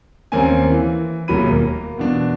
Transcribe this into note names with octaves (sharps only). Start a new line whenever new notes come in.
D#2 A#3 C4 C#4 G#5
E3
E1 D#2 F#3 A#3 B5 D#7
A#3
E2 B2 D4